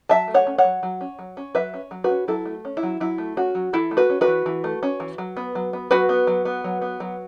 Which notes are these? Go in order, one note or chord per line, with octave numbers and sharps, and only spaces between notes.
F#3 E5 A5
A3
C#5 F#5
C#4
C#5 F#5
F#3
F#3
C#4
F#3
C#4
F#3 B4 E5
C#4
F#3
F#4 B4
C#4
F#3 E4 A4
A3
C#4
E4
F#3
F#3 E4
A3
C#4 F#4
F#3
E3 E4 A4
A3
F#4 B4
C#4
F#4 B4
E3
E3
A3
C#4
E3
F#3
B3
F#3
B3
F#3 F#4 B4
B3
F#3
B3
F#3
B3
F#3